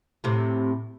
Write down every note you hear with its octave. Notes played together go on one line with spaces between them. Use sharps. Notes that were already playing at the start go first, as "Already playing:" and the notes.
A2 C3